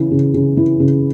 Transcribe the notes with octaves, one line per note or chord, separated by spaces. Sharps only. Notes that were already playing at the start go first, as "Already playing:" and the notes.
Already playing: C#3 E3
C#3
C#3
E3
C#3